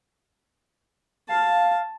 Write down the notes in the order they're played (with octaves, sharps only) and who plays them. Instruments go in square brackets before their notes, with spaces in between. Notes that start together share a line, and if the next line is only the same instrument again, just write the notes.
[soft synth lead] F5 [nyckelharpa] A5